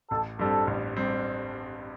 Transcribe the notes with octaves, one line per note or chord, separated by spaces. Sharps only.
A1 A4
G2 G3 C4 A4
A1
G3 C4